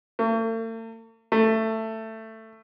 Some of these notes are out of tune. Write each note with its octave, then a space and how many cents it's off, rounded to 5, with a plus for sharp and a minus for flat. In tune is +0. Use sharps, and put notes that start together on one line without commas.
A3 +45
A3 +15